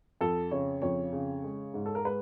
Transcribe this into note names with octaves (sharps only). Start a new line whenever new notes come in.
F2 A4
C#3 C#5
F2 C#5
C#3
G#3
G#2
A4
A#4
G#3 B4